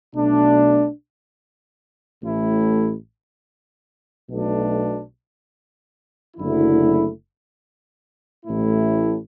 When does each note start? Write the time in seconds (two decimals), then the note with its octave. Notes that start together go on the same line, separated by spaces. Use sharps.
0.14 B1 B2 A3 D4
2.22 A1 A2 A3 E4
4.30 B1 B2 A3 D4
6.37 F#1 F#2 D3 A3 E4
8.45 A1 A2 A3 E4